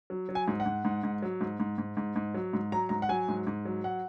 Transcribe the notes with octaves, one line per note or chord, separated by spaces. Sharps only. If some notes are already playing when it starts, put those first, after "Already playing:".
F#3
F#3
G#5
G#2
F#5
G#2
G#2
G#2
F#3
G#2
G#2
G#2
G#2
G#2
F#3
G#2
F#3 A#5
G#2 A#5
F#5
F#3 G#5
G#2
G#2
F#3
F#5